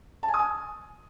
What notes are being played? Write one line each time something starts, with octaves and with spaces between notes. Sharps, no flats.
A5
G#5
D#6
G#5